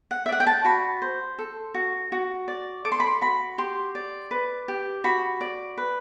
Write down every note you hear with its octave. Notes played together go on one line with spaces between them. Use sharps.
F#5
E5
D5 F#5
G5
A5
F#4 B5
C5
A4
F#4
F#4
D5
A4 D6
C6
B5
C6
F#4 B5
G4 C6
D5
B4
G4
F#4 B5
D5
B4